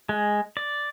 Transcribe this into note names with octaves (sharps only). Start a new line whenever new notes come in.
G#3
D5